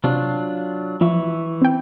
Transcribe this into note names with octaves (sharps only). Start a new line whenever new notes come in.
C3 F#3 D4 F4
E3 F3 E5 C#6
C4 G5